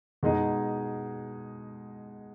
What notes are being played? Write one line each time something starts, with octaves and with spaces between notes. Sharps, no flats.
B2 G#3 D#4 G#4